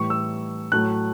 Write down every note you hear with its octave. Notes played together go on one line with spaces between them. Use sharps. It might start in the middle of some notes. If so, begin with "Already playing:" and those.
Already playing: A2 E3 G3 C#6
E6
A2 F#3 A3 F#6